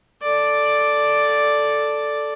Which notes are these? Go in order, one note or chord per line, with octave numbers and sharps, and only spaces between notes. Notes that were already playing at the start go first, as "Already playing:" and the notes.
A4 D5